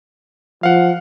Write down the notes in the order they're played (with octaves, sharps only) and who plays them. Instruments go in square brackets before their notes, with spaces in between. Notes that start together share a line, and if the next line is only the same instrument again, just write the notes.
[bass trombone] F3 [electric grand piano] F5 F#5